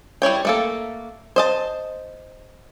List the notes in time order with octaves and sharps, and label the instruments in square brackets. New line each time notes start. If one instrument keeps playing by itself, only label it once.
[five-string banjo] G3 E4 C#5 G5
A3 A#3 A4
C5 D#5 A5